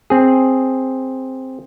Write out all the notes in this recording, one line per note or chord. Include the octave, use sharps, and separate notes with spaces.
C4 G#4